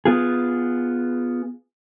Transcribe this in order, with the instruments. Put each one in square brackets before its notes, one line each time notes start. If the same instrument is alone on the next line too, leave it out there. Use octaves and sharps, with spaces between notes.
[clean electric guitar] B3 F4 G#4